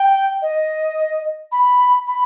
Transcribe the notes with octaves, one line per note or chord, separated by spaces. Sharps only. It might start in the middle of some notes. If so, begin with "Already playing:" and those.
Already playing: G5
D#5
B5
B5